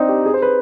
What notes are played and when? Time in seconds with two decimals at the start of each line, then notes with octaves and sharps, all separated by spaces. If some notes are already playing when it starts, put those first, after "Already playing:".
Already playing: C4 D4 D#4
0.09 G4
0.26 G#4
0.34 C5
0.42 B4